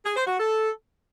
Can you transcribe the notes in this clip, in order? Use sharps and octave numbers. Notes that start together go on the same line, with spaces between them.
G#4
C5
F#4
A4